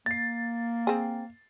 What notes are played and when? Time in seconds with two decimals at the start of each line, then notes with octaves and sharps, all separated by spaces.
0.06 A#3 A6 C7
0.87 C4 G#4